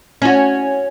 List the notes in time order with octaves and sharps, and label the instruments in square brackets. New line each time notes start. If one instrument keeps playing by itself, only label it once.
[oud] C#4 F#4